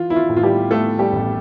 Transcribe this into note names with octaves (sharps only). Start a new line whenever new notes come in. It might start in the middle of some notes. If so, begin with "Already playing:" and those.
Already playing: E3 F4
E4
F4
A2
F4
G3 G4
G3 A3 A4
G3 G4
A1